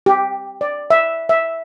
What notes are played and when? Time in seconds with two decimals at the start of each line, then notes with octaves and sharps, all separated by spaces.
0.06 G4
0.61 D5
0.90 E5
1.29 E5